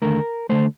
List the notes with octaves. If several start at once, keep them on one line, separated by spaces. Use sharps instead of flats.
D#2 D3 A3 A#4
D3 A3 C5